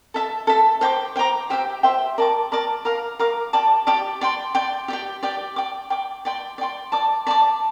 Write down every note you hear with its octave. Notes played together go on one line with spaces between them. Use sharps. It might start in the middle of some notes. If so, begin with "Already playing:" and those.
A4 E5 A5
A4 E5 A5
C5 G5 A#5 D6
C5 G5 A#5 D6
G4 C5 E5 G5
G4 C5 E5 G5
A#4 D5 A5 D6
A#4 D5 A5 D6
A#4 F5 A#5 D6
A#4 F5 A#5 D6
G4 D5 A5 D6
G4 D5 A5 D6
D5 G5 C6
D5 G5 C6
G4 D5 G5
G4 D5 G5
D5 G5 D6
D5 G5 D6
D5 G5 C6
D5 G5 C6
D5 A5 D6
D5 A5 D6